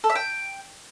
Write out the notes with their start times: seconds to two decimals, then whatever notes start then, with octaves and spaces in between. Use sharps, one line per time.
0.04 A4
0.10 E5
0.15 G5